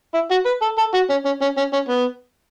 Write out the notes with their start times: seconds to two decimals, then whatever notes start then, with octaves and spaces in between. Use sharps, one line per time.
0.14 E4
0.31 F#4
0.46 B4
0.62 A4
0.78 A4
0.94 F#4
1.10 C#4
1.25 C#4
1.41 C#4
1.57 C#4
1.73 C#4
1.89 B3